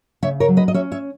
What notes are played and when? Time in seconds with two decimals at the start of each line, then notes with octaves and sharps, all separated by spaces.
0.23 C#3 C#5 E5
0.40 A#4 C#5
0.48 F#3
0.57 B4 D#5
0.68 D#5
0.74 C#4 C#5 E5
0.92 C#5 E5